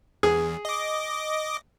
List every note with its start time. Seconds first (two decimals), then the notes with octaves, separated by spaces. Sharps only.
0.23 E2 G#4
0.65 D#5 D6